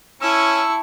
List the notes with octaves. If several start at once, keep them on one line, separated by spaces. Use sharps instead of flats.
C#4 E4 A5 C#6 E6